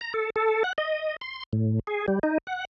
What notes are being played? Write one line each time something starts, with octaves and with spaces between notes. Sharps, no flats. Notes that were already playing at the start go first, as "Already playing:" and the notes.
A#5
A4
A4
F#5
D#5
C6
A2
G#4
G3
D#4
F#5